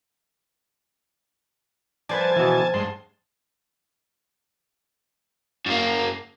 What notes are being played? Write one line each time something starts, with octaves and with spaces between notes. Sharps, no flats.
F3 B4 C5 D5 G#5 A5
B2 E3
G2 G#3 A5 C6
F#2 A#3